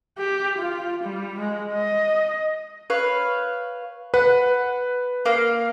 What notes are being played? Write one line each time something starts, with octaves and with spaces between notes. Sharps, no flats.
G4
F4
G3
G#3
D#5
B4 C#5 F5
B4 F#5
A#3 F5